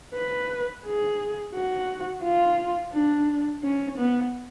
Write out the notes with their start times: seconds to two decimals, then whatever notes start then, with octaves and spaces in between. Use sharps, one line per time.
0.14 B4
0.85 G#4
1.54 F#4
2.23 F4
2.93 D4
3.63 C#4
3.97 B3